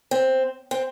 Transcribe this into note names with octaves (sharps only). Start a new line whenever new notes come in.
C4
C4